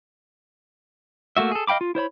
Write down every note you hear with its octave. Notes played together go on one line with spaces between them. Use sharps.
A3 A#3 F#4 E5
G#4 A4
D#5 F5 G5 B5 D6
F4
E4 C5 C#5 B5